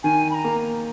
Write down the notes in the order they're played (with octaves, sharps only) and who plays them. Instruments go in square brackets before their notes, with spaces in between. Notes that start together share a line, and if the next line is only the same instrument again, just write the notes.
[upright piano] D#3 [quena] G#5
[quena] B5
A#5
[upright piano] A#3